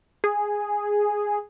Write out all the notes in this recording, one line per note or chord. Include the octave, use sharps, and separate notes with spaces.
G#4